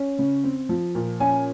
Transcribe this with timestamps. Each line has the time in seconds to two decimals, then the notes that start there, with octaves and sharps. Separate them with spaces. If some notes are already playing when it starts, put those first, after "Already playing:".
Already playing: C#4
0.19 C#3
0.44 C4
0.69 F3
0.95 A#2
1.20 C#4 G#5